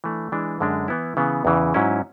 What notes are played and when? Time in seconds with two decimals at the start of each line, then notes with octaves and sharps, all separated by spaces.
0.04 E3 A3 D4
0.32 E3 G#3 D4
0.60 F#2 D3 G#3 D4
0.88 E3 B3 E4
1.17 C#3 E3 B3
1.45 E2 C#3 E3
1.74 G#2 F#3 C#4 E4